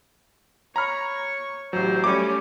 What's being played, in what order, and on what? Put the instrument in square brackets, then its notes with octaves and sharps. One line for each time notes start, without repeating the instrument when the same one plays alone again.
[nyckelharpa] C#5 C#6 [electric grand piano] A#5 B5 F6
[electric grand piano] A1 F#3 [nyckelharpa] G4 C5
[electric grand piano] G3 A3 D6 [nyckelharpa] C#4